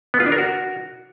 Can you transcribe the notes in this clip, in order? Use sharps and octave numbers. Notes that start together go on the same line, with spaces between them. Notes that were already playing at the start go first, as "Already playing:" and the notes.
B3
F4
D4
A#4
F#4